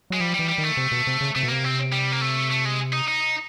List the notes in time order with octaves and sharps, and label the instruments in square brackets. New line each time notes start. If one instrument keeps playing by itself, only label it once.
[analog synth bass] F#3 [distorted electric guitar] G#3
[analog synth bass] F3 [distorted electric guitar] G3
[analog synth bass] E3 [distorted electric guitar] G3
[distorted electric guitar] G3
[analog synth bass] D#3
[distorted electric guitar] A3
[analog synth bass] C3
B2
C3
C#3
[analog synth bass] C3 [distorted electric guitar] A3
[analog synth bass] B2
[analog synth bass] C3 [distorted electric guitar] A#3
[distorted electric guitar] C4
G3
A#3
A3
A3
G#3
D#4
D#4